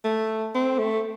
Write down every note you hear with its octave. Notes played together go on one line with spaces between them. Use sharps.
A3
C4
A3